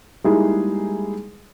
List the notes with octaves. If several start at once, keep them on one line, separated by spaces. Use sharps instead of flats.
G3 G#3 A#3 D#4 E4 G#4